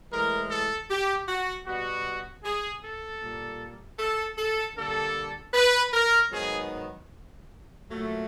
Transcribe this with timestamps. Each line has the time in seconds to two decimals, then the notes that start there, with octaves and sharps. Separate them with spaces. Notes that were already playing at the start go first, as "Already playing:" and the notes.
0.11 A2 E3 G#3 A#4
0.50 A4
0.89 G4
1.28 F#4
1.66 B2 G3 B3 F#4
2.44 G#4
2.82 A4
3.21 A#2 G3 A#3
3.99 A4
4.37 A4
4.76 D3 G3 A#3 A4
5.54 B4
5.92 A#4
6.31 G#2 D#3 F#3 B3 G#4
7.86 A#2 F#3 A3